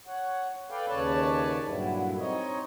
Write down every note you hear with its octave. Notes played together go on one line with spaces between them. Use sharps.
C#5 F#5
A4 B4 D5 F5 G5
D#2 C#3 B4 C#5 D5 A5
G2 A#2 D3 F#3 G3 E4
C4 D#4 C#5 D#5